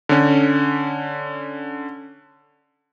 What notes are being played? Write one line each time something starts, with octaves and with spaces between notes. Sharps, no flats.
D3 C#4